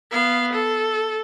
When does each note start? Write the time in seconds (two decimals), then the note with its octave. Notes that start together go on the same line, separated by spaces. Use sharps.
0.11 B3 F5
0.53 A4